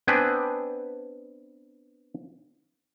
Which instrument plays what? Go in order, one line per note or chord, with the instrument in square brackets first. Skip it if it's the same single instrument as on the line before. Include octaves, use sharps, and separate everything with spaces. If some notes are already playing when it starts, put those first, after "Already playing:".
[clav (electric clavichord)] B3 C4 D4 B4 G5 G#5